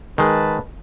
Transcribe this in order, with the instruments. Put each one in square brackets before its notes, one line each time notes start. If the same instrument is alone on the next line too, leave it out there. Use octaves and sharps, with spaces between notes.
[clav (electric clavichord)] D#3 G#3 [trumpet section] B4 A5